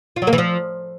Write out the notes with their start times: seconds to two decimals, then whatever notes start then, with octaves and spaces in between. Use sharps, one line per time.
0.16 F4
0.22 F#3
0.27 A#3
0.33 E3
0.38 F3